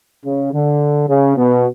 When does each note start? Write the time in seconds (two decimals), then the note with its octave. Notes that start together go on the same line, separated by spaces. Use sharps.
0.25 C#3
0.54 D3
1.09 C#3
1.37 B2